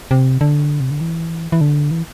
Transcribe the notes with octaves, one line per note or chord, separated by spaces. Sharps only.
C3
D3
C3
D3
E3
E3
D3
E3